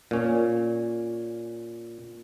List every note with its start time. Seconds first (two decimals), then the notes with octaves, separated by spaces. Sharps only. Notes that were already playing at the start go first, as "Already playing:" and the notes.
0.11 A#2 C#4